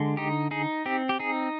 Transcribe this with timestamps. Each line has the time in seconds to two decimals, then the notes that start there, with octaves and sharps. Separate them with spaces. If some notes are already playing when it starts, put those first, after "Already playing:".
Already playing: D3 G#3
0.17 D#4 G4
0.51 D#4 G#4
0.86 C4 G4
1.09 G4
1.19 D#4 G#4